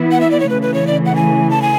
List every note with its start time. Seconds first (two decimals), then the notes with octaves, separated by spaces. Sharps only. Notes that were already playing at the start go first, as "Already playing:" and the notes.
Already playing: E3 B3 E4
0.12 F#5
0.21 E5
0.31 D5
0.40 C#5
0.49 C#3 E3 A3 B4
0.62 B4
0.74 C#5
0.87 D5
1.06 F#5
1.16 G#5
1.50 A5
1.62 G#5